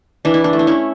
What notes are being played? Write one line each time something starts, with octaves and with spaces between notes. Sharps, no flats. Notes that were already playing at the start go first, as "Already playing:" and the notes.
E3 D4
E4
D4
A3
D4
C#4 E4